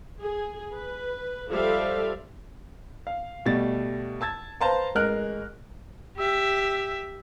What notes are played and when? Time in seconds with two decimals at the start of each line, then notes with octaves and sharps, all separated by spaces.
0.21 G#4
0.73 B4
1.49 F3 G3 A4 E5 F5
3.07 F5
3.46 B2 G3 A3 A6
4.21 A5 E6 G#6 A6
4.61 B4 C5 F5 A5 A#5 C6
4.95 A1 G#3 A#4 F6 F#6
6.17 G4 E5